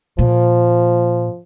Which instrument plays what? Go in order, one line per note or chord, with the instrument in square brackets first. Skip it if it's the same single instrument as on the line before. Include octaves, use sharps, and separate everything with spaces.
[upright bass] A#2 [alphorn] F3